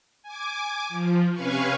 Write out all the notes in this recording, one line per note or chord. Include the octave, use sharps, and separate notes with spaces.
G#5 D6
F3
C3 C#4 B4 F5 G#5 C#6